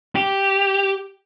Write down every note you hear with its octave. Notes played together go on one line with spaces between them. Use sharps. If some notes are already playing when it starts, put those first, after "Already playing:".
G4